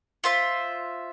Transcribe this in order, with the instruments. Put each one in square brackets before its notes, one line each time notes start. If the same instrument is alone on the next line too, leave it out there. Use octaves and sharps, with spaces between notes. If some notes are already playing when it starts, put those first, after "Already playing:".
[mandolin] F4 C5 E5